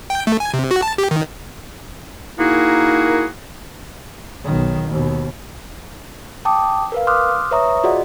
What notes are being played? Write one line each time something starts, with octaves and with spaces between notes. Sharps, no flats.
G5
A3
G#5
C3
F#4
A5
G4
D#3
A#3 D#4 E4 F#4 G#4 A#4
B1 D#3
D#2 B2
G5 A5 D6 D#6
A#4 B4 F5
C6 D6 D#6 F6 F#6
B4 C#5 E5 A#5 C#6 D#6
F4 F#4 G#4 D5 D#5 F#5